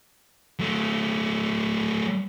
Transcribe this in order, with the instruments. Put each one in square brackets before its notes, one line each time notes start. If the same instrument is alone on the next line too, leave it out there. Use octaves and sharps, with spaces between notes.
[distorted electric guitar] F#3 A3